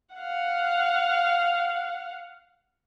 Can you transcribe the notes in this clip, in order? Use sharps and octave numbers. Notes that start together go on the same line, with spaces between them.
F5 F#5